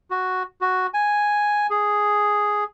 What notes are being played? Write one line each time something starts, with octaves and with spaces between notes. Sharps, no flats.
F#4
F#4
G#5
G#4